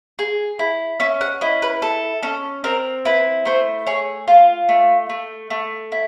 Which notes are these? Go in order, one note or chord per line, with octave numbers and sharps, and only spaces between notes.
G#4
E4
C#4 E5
F#5
E4 D#5
B4
A4
C#4 A4
C4 A#4
E4 B4
A3 C5
G#4 C#5
F4
A3
A3
A3
E4